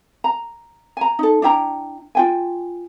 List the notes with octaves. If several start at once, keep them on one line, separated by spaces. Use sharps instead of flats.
A#5
G#5 A#5
D#4 A4
D4 E4 G5 A#5
F4 G5 G#5